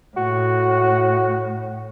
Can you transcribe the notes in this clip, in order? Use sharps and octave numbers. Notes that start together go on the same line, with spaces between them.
A2 F#4